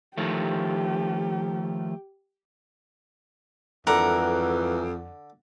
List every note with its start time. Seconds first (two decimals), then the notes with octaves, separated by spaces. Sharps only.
0.18 D#3 F3 A3 G4
3.87 F2 G#2 D3 E3 A#4 F#5